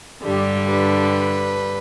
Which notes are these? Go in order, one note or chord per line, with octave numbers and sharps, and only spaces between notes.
G2 D3 G3 G4
B4